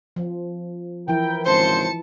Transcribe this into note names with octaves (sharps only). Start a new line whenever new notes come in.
F3
E3 F3 E4 A#4 G5
G#1 C#2 C#3 C5 A5 C#7